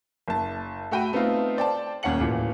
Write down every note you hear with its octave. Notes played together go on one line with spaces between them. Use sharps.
F#1 A5
A3 F#4 G5 B5 D#7
A3 B3 C4 D#4 F4
C5 D5 G5 A5
D#1 D#2 C#4 F#5 C#7 F#7
D1 A#2 E3